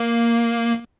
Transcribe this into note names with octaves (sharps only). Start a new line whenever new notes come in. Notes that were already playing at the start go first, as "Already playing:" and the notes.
Already playing: A#3